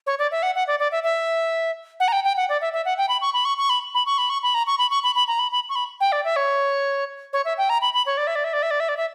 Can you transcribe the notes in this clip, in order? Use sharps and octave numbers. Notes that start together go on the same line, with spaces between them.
C#5
D5
E5
F#5
F#5
D5
D5
E5
E5
F#5
A#5
G5
G5
F#5
D5
E5
E5
F#5
G5
B5
C#6
B5
C#6
C#6
B5
B5
C#6
B5
C#6
B5
A#5
C#6
B5
C#6
B5
B5
A#5
B5
B5
C#6
B5
G5
D5
E5
C#5
C#5
E5
G5
A#5
B5
B5
C#5
D5
E5
D5
E5
D5
E5
D5
E5
D5
E5